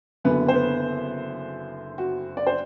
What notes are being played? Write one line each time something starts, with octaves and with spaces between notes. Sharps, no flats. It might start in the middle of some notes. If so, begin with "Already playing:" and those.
F#1 F#2 D3 B3 B4
C5
B3 B4
F#4
D5
C5